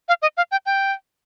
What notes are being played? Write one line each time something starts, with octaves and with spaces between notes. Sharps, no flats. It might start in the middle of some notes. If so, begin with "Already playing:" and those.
F5
D#5
F5
G5
G5